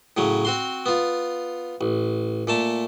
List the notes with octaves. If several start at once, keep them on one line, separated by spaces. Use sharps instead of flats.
A2 C#3 F#3
C4 F#4 C6
B3 F4
A1
A#2 A3 A5